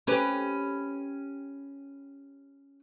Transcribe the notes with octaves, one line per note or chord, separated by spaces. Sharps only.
C#4 G4 B4